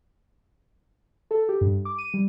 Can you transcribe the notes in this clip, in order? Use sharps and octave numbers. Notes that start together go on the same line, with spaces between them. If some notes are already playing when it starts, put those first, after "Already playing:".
A4
G4
G2
D6
D#7
G3